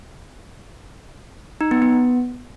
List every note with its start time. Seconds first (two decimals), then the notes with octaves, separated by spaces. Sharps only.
1.61 D#4
1.71 B3
1.82 B3